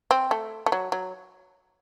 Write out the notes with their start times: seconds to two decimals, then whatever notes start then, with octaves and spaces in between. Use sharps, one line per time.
0.11 C4
0.31 A3
0.66 A3
0.72 F#3
0.92 F#3